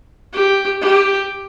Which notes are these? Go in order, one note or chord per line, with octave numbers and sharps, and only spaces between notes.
G4
G4